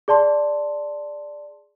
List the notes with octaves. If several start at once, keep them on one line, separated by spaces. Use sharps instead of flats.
G#4 D5 A5 C6